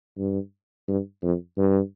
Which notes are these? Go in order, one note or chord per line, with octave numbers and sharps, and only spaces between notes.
G2
G2
F2
G2